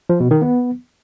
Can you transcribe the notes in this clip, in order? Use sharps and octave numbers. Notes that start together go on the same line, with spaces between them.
F3
B2
D#3
B3